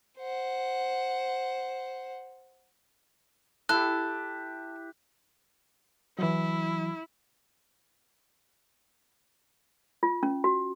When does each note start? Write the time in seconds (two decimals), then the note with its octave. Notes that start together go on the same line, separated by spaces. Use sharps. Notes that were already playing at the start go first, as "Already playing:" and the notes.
0.18 C5 F#5
3.69 E4 G4 A4 F#6
6.19 E3 F#3 E4
10.03 F4
10.23 C#4
10.44 F#4